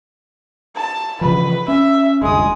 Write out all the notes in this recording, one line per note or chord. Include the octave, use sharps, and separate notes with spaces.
A5
C#3 E3 F3 B4
C#4 E5
F1 D2 G2 G#3 D#6